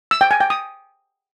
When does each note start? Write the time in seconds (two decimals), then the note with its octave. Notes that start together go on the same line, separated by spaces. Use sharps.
0.11 E6
0.21 G5
0.31 G#5
0.40 G5
0.50 D#6